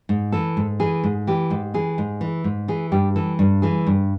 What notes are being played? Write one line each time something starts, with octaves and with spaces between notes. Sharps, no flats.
G#2
E3 A4
G#2
E3 G#4
G#2
E3 G4
G#2
E3 G#4
G#2
E3
G#2
E3 G#4
G2 G4
E3 A4
G2
E3 G#4
G2